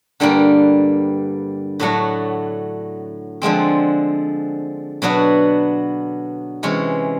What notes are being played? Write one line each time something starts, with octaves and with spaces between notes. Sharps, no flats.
G2 D3 G3 A#3
A2 F#3 A3 D4 F#4
D3 F3 G#3 C4
B2 F#3 B3 D4 F#4
C3 E3 G#3 C#4